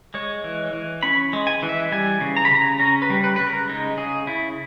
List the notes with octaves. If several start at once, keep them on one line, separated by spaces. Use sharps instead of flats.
G#3 C#5
E3
E3
C#4 B5
G#3
G#5
E3
E5
G3 G#5
C#3
A#5
B5
C#3 A#5
C#4 A#5
B4
G3
B4
C#3 B4
A#4
G#3 D#4
C#3 G#4
C#3 E4